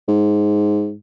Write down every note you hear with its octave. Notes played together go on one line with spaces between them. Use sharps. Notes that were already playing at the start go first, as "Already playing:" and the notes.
G#2